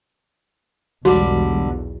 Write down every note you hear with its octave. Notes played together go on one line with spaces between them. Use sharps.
B1 E2 D3 E3 G3 G#3 F#4